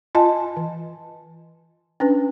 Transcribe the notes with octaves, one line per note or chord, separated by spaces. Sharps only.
F4 D#5 G#5 A5
E3
C#4 D4 B4